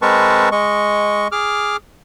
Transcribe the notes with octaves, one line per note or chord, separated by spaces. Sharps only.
G#3 C4 A#4 B4 A5 C#6
G#3 D#5 C#6
G#4 D6 F6